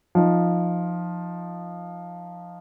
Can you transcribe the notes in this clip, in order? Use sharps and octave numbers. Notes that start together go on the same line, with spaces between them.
F3 D#4